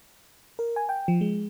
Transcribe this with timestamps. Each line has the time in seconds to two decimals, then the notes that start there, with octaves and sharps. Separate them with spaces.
0.59 A#4
0.76 G#5
0.89 G5
1.08 F3
1.21 G#3